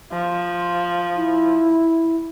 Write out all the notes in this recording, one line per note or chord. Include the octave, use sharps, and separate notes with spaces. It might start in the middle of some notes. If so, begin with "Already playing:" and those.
F3
E4